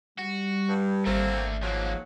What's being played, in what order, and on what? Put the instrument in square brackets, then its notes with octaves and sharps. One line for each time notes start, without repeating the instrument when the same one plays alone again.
[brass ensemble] G3 [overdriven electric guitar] F#4
[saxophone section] G2
[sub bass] G#1 [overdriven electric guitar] A3 D4 [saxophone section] A#3 C4
[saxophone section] G#2 F#3 [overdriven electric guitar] F3 A#3